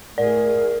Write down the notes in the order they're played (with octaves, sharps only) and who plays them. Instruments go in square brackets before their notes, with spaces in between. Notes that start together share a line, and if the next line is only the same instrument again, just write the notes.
[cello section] A2 G#4 [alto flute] A#4 [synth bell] D5